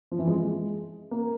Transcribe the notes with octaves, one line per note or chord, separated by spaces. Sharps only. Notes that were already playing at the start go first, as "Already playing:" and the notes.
F3
E3
G#3
G#3
A#3